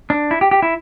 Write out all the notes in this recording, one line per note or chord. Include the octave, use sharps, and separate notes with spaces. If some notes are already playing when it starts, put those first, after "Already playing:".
D4
E4
G4
G4
E4